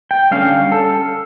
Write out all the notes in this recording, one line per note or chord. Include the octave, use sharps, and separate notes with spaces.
G5
D3 G3 C#4 F5
A4